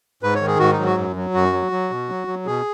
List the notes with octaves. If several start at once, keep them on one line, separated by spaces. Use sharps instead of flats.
G#2 B4
C#5
D#3
G#4
G#2 F#4
D#4
F#3
F#4
F#2
F#3
F#2 F#4
F#3
F#3
B2
F#3
F#3
B2 G#4